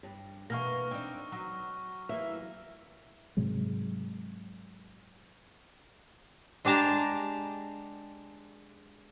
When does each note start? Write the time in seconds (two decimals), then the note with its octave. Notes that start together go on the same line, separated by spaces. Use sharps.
0.03 G2
0.50 B2 E3 A#3 F5 C#6 F6 A#6
0.91 C4 D4 D#4
1.32 F#3
2.09 E3 A#3 E5
3.37 G#2 C3 F#3 G#3
6.65 G#3 D4 G4 A5 A#5